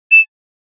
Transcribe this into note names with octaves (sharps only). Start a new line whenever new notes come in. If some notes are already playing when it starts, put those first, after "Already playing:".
E7